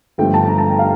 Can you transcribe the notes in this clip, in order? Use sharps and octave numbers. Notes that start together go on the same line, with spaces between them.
G1 G2 F3 A3 G5
A5
A#5
A5
G5
F5